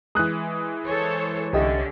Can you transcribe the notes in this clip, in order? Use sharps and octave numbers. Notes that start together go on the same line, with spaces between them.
E3 G#3 D#6 F#6
A4 C5 C#5
C2 D3 C#4 G4 D#5 E5